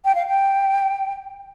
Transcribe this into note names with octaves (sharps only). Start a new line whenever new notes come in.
G5
F5
G5